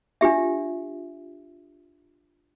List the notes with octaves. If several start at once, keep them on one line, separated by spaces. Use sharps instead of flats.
D4 F4 G4 E5